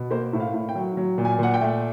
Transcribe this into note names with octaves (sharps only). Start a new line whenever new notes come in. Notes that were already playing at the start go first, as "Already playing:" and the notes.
Already playing: B2
A#3 C5
A2
F5
A2
G5
F#3
F#3
A#2
G#5
A#2 F#5
G5
A3